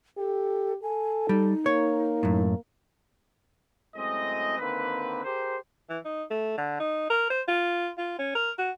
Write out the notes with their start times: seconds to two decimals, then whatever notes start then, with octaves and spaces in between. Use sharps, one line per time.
0.18 G4 A4
0.83 A4 G#5
1.29 G3 D#4
1.66 A#3 C#5
2.23 F#2 A2
3.95 F#2 A2 G#3 C4 D#5
4.59 D3 D#3 A#3 C4 B4
5.24 G4 G#4 A#4 C5
5.89 E3
6.05 D#4
6.31 A3
6.58 D3
6.80 D#4
7.10 A#4
7.30 C5
7.48 F4
7.98 F4
8.19 C#4
8.35 A#4
8.58 F#4